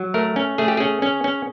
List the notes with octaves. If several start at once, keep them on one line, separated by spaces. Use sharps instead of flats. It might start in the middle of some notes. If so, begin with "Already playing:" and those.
Already playing: F#3
A3 A#4
C#4
A3 G#4
G4
C#4 G#4
C#4
C#4